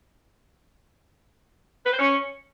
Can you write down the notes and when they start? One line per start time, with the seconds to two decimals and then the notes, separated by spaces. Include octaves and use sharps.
1.86 B4
1.93 C5
1.99 C#4